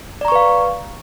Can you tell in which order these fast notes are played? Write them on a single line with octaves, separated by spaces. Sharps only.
D5 A#5 C#6 B4 F5